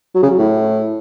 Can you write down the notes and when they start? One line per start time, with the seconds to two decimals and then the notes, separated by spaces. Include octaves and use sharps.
0.15 F#3
0.23 C#3
0.30 F#3
0.38 A2